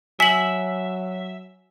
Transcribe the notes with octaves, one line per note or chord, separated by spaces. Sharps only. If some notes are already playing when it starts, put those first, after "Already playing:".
F#3 E5 G#5 B6 F#7